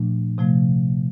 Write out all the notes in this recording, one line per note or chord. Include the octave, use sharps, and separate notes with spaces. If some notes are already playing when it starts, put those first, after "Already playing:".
Already playing: A#2 F3 A3 D4
C3 F3 A3